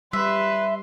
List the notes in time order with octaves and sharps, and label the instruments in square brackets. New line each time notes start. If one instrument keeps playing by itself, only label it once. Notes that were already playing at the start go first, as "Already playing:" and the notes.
[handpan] G3 [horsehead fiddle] B4 [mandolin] E5 [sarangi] C6